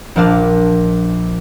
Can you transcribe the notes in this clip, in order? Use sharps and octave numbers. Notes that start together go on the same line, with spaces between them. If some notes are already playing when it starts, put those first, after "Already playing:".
A#1 F3 D4 F5 A5